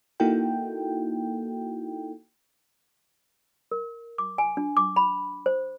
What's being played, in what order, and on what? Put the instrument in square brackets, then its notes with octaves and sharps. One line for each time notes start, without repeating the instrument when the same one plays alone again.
[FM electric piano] A#3 D#4 E4 F#4 A4 G5
[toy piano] A#4
D6
G#5
D4
D6
B5
C5